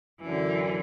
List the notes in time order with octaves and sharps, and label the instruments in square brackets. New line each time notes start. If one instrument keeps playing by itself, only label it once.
[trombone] F#2 [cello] D3 E3